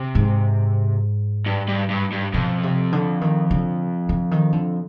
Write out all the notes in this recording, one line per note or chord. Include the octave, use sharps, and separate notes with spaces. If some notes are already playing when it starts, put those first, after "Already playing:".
Already playing: C3
G#2
G2
G2
G2
G2
F2 B2
C3
D3
D#3
D3
D3
D#3
D3